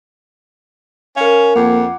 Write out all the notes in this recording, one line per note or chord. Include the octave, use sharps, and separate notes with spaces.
C#4 A#4 F5
F2 A#3 F#5 D6